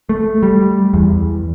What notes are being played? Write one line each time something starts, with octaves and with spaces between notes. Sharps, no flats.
A3
G3
E2